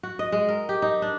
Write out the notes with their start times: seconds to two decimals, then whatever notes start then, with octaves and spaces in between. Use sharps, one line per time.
0.03 F#4
0.19 D#5
0.32 G#3
0.49 A#4
0.69 G4
0.82 D#4
1.02 D4